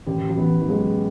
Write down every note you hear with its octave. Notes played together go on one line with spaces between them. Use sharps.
A1 D#3
F#3
E3 B3
E3
F#3 G#3